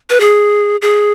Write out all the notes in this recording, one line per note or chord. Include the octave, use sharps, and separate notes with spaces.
B4
G#4
G#4